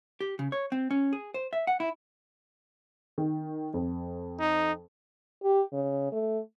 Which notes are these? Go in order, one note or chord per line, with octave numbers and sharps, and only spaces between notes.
G4
C#3
C#5
C4
C#4
G#4
C5
E5
F#5
E4
D#3
F2
D#4
G4
C#3
A3